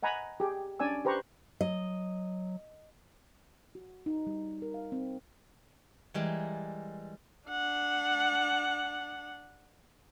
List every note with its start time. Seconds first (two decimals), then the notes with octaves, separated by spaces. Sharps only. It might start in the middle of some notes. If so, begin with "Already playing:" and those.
0.03 D#5 F#5 G#5 A#5 B5
0.40 G4 G#4
0.80 C#4 D4 D5 G#5 E6
1.05 G4 B4 C5 A#5 B5 C#6
1.61 F#3 D#5
3.75 F#4
4.06 D#4
4.27 G3
4.62 A#4
4.74 F5
4.92 C4
6.14 E3 G3 G#3 A#4 A5
7.49 D4 F#5